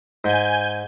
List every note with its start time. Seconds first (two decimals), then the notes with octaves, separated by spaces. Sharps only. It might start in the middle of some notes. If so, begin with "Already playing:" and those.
0.24 G#2 G#5 G6